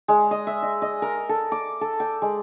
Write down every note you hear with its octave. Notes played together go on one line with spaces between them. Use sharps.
G#3
D#5
E5
D#5
D#5
A#4
A4
D6
A4
G5
G#3